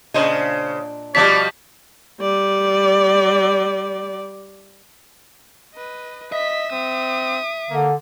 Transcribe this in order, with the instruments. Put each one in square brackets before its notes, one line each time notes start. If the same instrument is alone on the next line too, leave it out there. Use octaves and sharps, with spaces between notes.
[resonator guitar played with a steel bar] A#2 D4 D#5 [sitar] C#3 C5
[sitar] B2 F3 G3 [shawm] D5 [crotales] B6
[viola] G3 D5
[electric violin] B4 D#5
[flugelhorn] D#5 [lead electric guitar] E5 [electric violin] B6
[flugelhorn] C4 [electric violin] D#6
[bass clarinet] D3 [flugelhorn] A#3